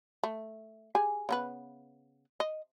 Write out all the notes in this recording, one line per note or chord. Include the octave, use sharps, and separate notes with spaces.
A3
G4 G#4 G#5
C#3 B3 B4
D#5